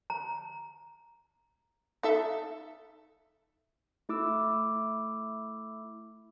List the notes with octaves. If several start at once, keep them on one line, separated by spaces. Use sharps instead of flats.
A#5
D#4 A4 E5
A3 E4 D6 E6